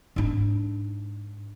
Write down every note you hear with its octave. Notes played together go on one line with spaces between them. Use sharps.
G#2 D4